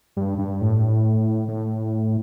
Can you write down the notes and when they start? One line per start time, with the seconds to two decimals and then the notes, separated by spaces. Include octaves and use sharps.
0.17 G2
0.38 G2
0.61 A2
1.48 A2